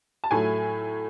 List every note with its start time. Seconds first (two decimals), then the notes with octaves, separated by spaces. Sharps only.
0.24 A5
0.31 A2 F#3 A3 G#5